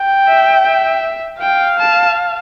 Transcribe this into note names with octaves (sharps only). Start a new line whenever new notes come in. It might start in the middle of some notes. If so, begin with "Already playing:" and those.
Already playing: G5
E5
E5
F5 G5
A5